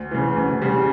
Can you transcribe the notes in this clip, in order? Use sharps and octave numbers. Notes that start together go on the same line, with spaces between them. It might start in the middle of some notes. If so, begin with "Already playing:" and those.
Already playing: D2
C#3 E3
D2
C#3 G3